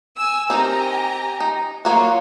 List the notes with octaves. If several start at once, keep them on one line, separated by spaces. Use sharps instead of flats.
G#5 E6
C4 D#4 G4 A#4 G#5 A#5
D#4
F#3 A#3 F4 F#4 C#5